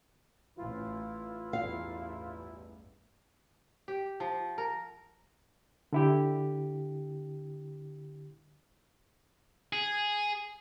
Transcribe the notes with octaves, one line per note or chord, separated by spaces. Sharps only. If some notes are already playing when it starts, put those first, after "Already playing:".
A1 E3 E4 F4
A1 E2 G2 F5
G4
F3
A#4
D3 E4 G4
G#4